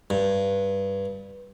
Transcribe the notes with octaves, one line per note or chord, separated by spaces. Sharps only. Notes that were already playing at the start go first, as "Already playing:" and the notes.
G2